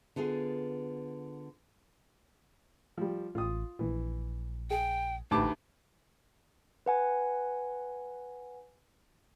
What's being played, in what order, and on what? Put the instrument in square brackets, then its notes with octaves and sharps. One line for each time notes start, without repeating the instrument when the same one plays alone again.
[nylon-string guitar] D3 B3 F4 G#4
[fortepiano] F3 G3
[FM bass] A1 [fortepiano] F4 D#6
[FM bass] A#1 [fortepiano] E3
[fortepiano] G#4 [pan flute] G5
[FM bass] A1 [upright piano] D2 A5 D6 [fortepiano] A3 G4 B4 [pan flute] D#4
[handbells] B4 F#5 G#5